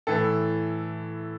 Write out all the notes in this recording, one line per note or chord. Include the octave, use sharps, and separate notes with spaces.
A2 E3 A4